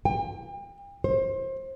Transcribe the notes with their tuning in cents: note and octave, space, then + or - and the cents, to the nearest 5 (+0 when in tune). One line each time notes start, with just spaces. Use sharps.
G5 +40
C5 +30